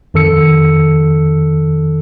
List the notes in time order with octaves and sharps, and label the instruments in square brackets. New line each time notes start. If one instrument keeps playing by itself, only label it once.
[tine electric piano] F2 D#3 A4 E6 C#7